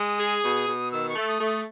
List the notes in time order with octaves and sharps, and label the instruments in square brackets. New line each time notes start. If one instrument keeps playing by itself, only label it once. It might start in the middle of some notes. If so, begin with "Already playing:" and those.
Already playing: [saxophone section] G#3 [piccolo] D#6
[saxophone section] G#4
B2
B2
[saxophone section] D#3 [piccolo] E6
[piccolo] C#6
[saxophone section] A3 [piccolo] E6
[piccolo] D#6
[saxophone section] A3
[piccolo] D#6